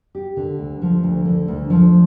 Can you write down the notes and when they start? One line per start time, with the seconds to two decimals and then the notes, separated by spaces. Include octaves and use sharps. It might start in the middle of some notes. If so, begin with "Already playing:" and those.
0.15 G4
0.37 D3
0.59 D2
0.82 F3
1.04 D2
1.25 D3
1.48 D2
1.70 F3